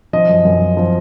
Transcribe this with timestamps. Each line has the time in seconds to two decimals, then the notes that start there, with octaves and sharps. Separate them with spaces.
0.13 F3 D#5
0.29 F#2
0.45 F#2
0.62 F3
0.77 F3